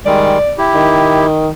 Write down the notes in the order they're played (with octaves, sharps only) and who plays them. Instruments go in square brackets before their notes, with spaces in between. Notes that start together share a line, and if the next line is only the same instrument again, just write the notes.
[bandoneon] D#3 G3 G#3 [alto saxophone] D5
[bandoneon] E4 G4
[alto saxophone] D#3